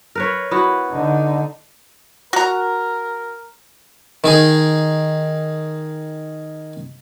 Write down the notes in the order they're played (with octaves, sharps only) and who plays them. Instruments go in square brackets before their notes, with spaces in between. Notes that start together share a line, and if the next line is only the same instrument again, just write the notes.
[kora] A#4 B4 C#5
B3 E4 F#4
[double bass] D3 D#4
[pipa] F#4 A#5 [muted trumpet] A#4
[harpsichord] D#3 D#4 G#4